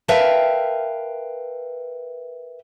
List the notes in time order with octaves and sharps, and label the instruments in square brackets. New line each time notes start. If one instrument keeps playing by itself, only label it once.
[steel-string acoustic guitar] A#4 B4 E5 F5 G5 A5